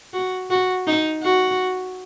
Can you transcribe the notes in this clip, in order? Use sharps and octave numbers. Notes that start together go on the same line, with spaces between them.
F#4
F#4
D#4
F#4